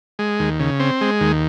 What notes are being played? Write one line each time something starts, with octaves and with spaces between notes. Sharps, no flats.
G#3
D#2
C#3
C4
G#3
D#2